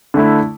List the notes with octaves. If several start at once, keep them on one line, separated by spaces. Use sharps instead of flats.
D3 A3 E4